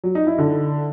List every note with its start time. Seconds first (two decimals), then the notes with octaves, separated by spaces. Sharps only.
0.04 F#3
0.15 D#4
0.27 E4
0.39 D3